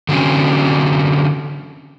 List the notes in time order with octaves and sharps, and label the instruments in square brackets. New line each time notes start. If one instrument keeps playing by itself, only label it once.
[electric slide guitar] D3 F#3 C4 C#4